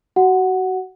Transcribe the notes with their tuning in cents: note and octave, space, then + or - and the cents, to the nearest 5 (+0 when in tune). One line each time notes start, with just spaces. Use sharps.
F#4 +25 F#5 +0